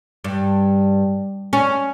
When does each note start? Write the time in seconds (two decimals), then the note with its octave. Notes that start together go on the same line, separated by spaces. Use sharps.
0.24 G2
1.53 C#4